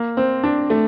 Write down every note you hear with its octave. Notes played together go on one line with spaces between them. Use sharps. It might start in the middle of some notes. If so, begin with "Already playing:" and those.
Already playing: A#3
C4
D4
A3